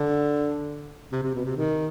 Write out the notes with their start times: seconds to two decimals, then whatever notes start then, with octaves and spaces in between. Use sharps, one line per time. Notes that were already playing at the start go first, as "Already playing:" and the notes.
Already playing: D3
1.12 C3
1.23 C3
1.35 B2
1.45 C3
1.57 D#3